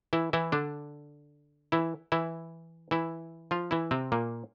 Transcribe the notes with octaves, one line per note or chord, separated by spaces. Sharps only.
E3 E4
E3 E4
D3 D4
E3 E4
E3 E4
E3 E4
F3 F4
E3 E4
C3 C4
A#2 A#3